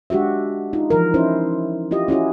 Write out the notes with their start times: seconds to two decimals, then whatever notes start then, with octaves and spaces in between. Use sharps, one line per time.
0.10 G#3 D4 F#4 G4 E5
0.73 D#4 F4
0.90 E3 F3 A#4
1.14 C#4 D#4 E4 C5
1.91 E4 F4 G4 D#5
2.08 C#4 E4 F#4 G#4